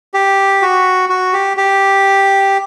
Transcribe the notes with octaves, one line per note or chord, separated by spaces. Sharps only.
G4
F#4
F#4
G4
G4